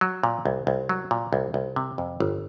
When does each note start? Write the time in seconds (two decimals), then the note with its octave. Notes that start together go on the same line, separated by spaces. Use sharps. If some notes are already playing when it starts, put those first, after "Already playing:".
0.01 F#3
0.23 A#2
0.45 C2
0.67 C2
0.89 F#3
1.11 A#2
1.33 C2
1.54 C2
1.76 C3
1.98 F2
2.20 G1